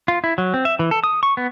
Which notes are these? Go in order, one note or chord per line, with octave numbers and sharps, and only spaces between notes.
F4
E4
F#3
C4
E5
E3
A4
D#6
C#6
B3